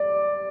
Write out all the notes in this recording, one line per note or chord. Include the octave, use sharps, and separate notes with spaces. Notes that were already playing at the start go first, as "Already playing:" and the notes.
Already playing: D5